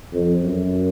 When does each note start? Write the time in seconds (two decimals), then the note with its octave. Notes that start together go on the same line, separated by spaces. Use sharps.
0.12 F2
0.41 F#2